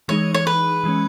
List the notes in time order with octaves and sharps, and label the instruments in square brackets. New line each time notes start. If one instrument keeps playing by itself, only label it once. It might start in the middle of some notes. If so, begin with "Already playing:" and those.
[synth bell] E3 G#3 D#4 G#4 [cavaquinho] C#5
[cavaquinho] C#5
B4
[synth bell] E3 G#3 C#4